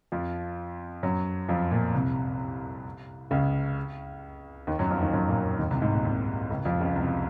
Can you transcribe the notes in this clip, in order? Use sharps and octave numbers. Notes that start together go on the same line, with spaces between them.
F2 F3
F#2 F#3
F2 F3
A#2
C2 C3
C#2 C#3
D#2 D#3
F#2 F#3
F2 F3
D#2 D#3
F#2 F#3
A#2 A#3
D#2 D#3
C2 C3
G#2
A#2
C2 C3
C#2 C#3
F2 F3
C#2 C#3
C2 C3